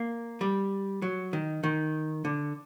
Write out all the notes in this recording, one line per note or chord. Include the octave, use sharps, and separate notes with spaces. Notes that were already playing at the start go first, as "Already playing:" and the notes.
Already playing: A#3
G3
F#3
D#3
D#3
D3